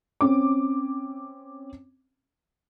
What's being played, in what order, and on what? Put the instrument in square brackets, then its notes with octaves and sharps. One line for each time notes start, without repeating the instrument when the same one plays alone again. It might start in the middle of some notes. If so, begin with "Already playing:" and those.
[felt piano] C4 C#4 D6